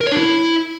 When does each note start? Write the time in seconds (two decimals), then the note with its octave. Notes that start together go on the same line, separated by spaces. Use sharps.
0.01 A#4
0.06 C#5
0.12 D4
0.17 E4